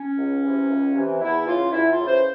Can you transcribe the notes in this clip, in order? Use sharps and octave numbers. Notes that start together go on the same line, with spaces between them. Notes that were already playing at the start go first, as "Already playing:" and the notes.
Already playing: C#4
C#2
C3 E3
C#2
C3
E3
E2 E4
C#3 E3 F4
E2 E4
F4
C#3 E3
C5